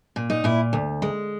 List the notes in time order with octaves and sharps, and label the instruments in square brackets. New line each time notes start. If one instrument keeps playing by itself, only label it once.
[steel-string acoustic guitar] A#2
D#4
A#2 E4
D2
G#3